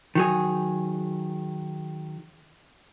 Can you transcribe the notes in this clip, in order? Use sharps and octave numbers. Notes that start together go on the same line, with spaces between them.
D#3 F#3 G#4